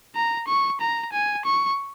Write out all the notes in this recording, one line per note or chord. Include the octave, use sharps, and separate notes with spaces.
A#5
C#6
A#5
G#5
C#6